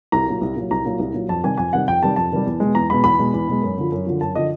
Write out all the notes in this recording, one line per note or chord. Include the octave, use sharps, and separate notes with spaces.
C2 A#5
A#2 F#3
C2
A#2 F#3
C2 A#5
A#2 F#3
C2
A#2 F#3
F2 A5
C3 D#3 G3 G#5
F2 G#5
C3 D#3 G3 F#5
F2 G5
C3 D#3 G3 A5
F2 A5
C3 D#3 G3
E2
B2 G#3
E2 A#5
B2 G#3 B5
E2 B5
B2 G#3
E2
B2 G#3
F#2
D3 F3
F#2
D3 F3
F#2 A5
D3 F3 D#5